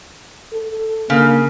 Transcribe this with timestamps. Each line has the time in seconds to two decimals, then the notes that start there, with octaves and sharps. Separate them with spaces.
0.53 A4
1.10 C#3 A#3